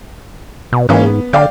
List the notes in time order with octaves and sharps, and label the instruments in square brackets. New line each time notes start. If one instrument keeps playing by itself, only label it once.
[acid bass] B2
[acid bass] G#2 [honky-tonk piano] E3 A#3 C#4
[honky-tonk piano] B3
[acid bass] D3 [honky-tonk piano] D5 F5 G5